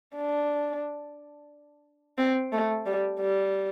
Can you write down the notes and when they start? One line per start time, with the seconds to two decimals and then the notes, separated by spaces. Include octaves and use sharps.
0.16 D4
2.18 C4
2.52 A3
2.86 G3
3.20 G3